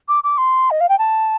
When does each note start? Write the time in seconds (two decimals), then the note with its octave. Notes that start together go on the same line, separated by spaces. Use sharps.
0.08 D6
0.24 D6
0.38 C6
0.71 D#5
0.81 F5
0.89 G5
0.99 A5